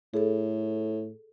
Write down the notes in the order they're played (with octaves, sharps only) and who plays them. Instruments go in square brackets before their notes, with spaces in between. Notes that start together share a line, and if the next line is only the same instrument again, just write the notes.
[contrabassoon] A2 [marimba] G#4 A4